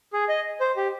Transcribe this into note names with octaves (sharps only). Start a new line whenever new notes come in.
G#4
D#5
C5
G4